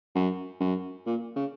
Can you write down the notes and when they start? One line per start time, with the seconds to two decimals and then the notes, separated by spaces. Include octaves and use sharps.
0.15 F#2
0.61 F#2
1.06 A#2
1.36 C#3